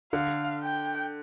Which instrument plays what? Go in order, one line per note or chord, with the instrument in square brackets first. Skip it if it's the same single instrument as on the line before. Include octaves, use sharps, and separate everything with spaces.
[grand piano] D3 [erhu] F5
[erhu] G5